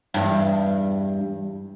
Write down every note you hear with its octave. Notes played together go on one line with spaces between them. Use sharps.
E2 G2